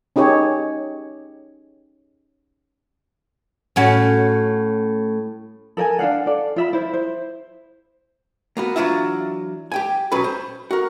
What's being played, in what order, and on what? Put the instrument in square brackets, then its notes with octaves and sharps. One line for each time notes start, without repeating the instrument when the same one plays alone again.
[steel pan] C#4 D#4 G4 G#4 C#5
[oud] A2 C#4 F#4
[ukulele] A4 A#4 G5 G#5
D4 F4 F5 F#5
A4 D5
F4 E5 B5
E4 C5
C5
[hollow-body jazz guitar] A#3 B3 F#4
E3 F#3 D4 F4 F#4 E5
G4 G5 G#5
B1 F#3 C#4 B4 B5
C5
F#4 A#4